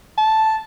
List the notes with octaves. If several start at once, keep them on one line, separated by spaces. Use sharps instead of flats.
A5